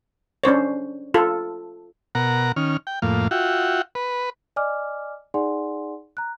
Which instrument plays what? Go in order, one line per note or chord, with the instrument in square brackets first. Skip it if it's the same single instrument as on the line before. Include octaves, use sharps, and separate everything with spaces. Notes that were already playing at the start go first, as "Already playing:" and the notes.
[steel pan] C#4 D4 C5 C#5
F4 A4
[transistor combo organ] B2 A#4 F#5 A#5
D#3 C#4 F6
G5
F2 A2 A#3 F5
F4 F#4 E5 F#5 G5
B4
[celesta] D5 D#5 G#5 D6 F6
D#4 G#4 D5 F#5 G#5 C6
A#5 F#6